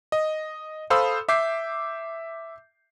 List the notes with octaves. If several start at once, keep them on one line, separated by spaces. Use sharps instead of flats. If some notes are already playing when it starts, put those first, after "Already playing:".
D#5
A4 C5 F5 B5 D#6 E6
E5 D6 G6 C7